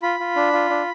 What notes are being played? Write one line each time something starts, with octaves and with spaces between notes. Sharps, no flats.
F4 B5
F4
D4
F4
D4